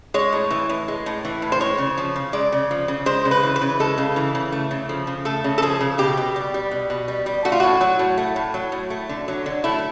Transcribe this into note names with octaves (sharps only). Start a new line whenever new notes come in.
G#3 C#5
A2
E3
A2
G#3
A2
E3
A2
C5
G#3 C#5
C#3
F3
C#3
G#3 D5
C#3
F3
C#3
G#3 C5
C#3
B4
E3
B4
C#3
G#3 A4
C#3
E3
C#3
A3
C#3
F3
C#3
A3 A4
C#3
A4
F3 G#4
C#3
B2 G4
B2
G3
G3
B2
B2
G3
G3
A3 F#4
F4
A2 F#4
F#3
A2
A3
A2
F#3
A2
A3
D3
F#3
D3
A3 E4